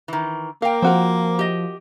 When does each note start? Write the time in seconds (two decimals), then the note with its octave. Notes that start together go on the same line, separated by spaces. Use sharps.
0.08 D#3 E3
0.62 A#3 A#4 F5 G5
0.82 F3 C4 F#4 A#4
1.39 G4 D#5